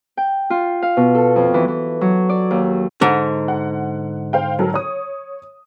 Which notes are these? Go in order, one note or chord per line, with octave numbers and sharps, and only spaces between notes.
G5
F4
F5
B2
A4
F2
E3
E3
F#3
D5
D#2
G#2 D3
F#5
C5 F5 G5
F#3 A4 A#4
C#5 D#6